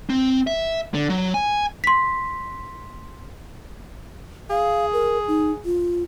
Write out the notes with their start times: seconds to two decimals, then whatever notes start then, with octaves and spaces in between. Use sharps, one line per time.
0.10 C4
0.47 E5
0.94 D3
1.10 F#3
1.34 G#5
1.84 C6 B6
4.50 G#4 F5
4.93 A#4
5.28 D#4
5.65 F4